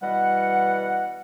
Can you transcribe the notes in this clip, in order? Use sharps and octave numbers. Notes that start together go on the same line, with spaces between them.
B2 E3 G3 D#5 F#5